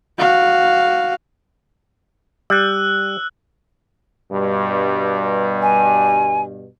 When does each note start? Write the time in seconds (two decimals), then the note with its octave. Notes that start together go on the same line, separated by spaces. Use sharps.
0.18 F#4 F5
2.50 G3 E6 F#6
4.31 G2 B2
5.62 G#5